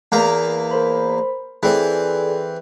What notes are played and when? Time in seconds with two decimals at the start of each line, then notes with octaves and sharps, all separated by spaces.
0.12 E2 A#3 A#5
0.71 A#4 C5 B5
1.63 E3 C4 G#4 A4 D5